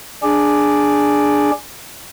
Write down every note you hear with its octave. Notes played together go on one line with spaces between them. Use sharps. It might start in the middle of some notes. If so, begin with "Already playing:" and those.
D4 G#4 D5